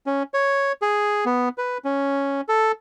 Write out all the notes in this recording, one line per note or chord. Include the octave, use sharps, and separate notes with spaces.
C#4
C#5
G#4
B3
B4
C#4
A4